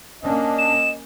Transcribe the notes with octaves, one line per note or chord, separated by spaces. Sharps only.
A#3 C#4 D4 D#5
E7